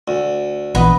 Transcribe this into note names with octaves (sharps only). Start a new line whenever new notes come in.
D2
A#1 E3 B3 B4 D#5